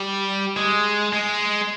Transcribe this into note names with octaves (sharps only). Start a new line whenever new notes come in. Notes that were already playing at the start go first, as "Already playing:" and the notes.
Already playing: G3
G#3
G#3